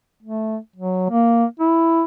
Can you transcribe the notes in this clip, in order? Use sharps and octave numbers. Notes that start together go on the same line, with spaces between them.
A3
F#3
A#3
E4